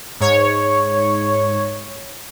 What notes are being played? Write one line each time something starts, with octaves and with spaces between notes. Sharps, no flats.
G#2 C#5